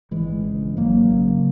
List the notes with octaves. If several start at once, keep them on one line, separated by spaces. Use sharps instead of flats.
G#1 E3 G#3
G#1
C#3
G#1
G#1 F#3 A#3
G#1
C#3
C#3